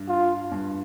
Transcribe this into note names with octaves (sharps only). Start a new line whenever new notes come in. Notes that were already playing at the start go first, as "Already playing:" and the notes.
Already playing: G2
F4
G2